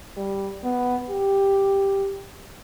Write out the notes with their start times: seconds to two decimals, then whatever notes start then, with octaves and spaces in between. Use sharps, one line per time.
0.16 G3
0.64 B3
1.10 G4